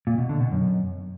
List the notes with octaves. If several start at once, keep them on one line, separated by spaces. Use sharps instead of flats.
A#2
B2
D3
B2
F#2